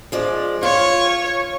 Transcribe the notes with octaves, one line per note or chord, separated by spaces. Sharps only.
F3 G#3 D5
F4 C#5